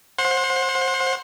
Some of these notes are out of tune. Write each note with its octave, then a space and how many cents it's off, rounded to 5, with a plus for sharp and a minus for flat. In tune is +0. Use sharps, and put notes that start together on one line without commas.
C5 +20 F#5 -25 C6 +20